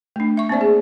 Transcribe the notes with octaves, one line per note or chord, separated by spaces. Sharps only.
A3 D4
E5 C#6
A#3 C4 C5 D5
G#4